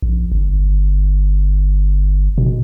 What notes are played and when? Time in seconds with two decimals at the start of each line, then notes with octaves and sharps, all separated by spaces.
0.02 A#1
0.32 G1
2.38 B2